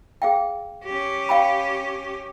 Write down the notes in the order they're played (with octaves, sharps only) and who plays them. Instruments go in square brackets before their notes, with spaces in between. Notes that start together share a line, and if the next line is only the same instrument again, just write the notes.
[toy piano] G#4 F5 G5
[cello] C#4 G4
[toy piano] F5 G5 B5